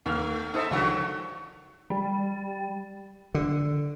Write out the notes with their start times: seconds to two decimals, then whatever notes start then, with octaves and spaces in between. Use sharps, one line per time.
0.06 D#2 A3 F6
0.54 D#4 A4 C5 E5 D#6
0.71 C#2 D3 D#3 F3 F#4
1.90 G3
3.34 D3